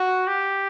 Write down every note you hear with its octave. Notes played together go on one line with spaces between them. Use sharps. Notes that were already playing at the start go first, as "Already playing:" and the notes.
Already playing: F#4
G4